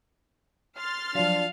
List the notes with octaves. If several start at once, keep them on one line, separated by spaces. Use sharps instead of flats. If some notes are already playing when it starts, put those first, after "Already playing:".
C6 F6 A6
F3 F#3 D4 F5